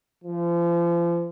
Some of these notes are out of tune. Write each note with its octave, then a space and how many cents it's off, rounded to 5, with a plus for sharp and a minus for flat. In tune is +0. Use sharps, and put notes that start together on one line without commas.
F3 -35